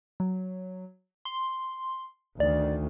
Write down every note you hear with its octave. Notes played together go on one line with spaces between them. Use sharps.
F#3
C6
D2 D#3 D5